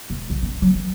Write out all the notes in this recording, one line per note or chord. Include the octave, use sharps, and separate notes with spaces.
E1
B1
C#4
F#3
E3